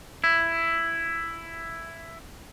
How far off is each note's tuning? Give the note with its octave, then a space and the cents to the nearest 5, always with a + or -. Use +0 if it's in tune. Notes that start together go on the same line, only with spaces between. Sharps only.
E4 +10